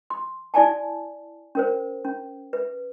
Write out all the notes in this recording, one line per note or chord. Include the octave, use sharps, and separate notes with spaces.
C6
E4 D5 G#5 A5
C#4 A#4 C5
C#4
B4